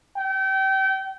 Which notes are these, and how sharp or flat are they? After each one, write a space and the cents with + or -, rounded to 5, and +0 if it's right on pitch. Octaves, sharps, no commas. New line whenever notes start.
G5 -30